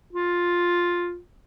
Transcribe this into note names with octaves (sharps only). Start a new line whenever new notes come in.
F4